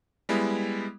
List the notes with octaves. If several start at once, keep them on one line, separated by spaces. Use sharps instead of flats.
G3 G#3 B3 E4